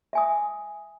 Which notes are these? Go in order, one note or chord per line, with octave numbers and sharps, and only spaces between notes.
E5 G#5 D#6